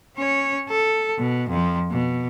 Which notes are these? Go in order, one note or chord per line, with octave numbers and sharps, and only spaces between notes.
C#4 C#5
A4
B2
F2 F3
B2